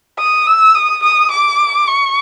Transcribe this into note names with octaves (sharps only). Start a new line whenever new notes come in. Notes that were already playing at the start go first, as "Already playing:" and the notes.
D#6
E6
D#6
D#6
D6
C#6